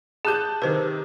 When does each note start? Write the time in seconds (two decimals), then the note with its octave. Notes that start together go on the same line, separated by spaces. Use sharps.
0.25 G4 G#4 A5 F#6 G6
0.62 C3 D#3 B4 C5